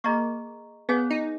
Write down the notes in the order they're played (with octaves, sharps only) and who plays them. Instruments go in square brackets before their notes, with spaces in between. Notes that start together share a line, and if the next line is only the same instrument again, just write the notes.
[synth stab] A#3 [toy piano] G#4 D#5 A#5 C#6
[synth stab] B3 [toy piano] G#4 C#5 F5 G#5
[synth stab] D#4